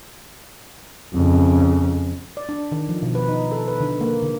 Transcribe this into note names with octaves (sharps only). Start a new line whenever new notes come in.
F2 C#3
D5
D4
D#3
F3
B2
B4
D#4
A4
B4
D3
A#3
D3